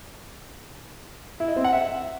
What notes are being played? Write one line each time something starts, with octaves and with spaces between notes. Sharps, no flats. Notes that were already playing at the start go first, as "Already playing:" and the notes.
E4
D#5
C4
F#5
E5